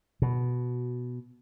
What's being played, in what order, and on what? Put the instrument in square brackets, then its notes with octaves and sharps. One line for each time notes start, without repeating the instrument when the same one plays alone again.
[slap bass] B2